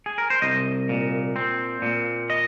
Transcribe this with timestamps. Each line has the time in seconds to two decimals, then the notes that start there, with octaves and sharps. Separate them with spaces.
0.06 G#4
0.18 A#4
0.30 C5
0.42 C2 D#5
0.89 A#2
1.36 C4
1.82 A#2
2.30 D#5